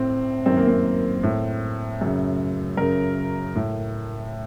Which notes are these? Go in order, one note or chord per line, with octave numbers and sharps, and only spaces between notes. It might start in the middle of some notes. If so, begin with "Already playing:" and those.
Already playing: A2 C4
F#2 D#3 C4
A#3
C4
A2
F#2 C#3
F#2 C#3 A#4
A2